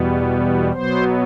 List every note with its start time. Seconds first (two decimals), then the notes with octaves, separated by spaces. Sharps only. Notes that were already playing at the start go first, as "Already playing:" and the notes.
Already playing: E2 B2 G3 B3
0.72 B2 F#3 B3 C5